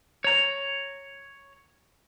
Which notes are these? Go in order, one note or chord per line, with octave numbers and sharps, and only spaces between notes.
C#5 A#5